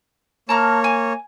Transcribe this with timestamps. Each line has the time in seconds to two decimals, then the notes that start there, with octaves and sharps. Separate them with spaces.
0.49 A#3 C#5 A5 A#5 F6
0.84 G#5